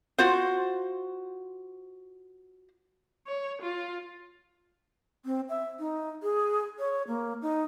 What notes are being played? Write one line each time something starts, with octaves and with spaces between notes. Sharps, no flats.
F4 F#4 C5
C#5
F4
C4
E5
D#4
G#4
C#5
A#3
D#4